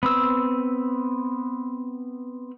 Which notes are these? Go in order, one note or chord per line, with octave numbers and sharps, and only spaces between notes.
B3 C4 E6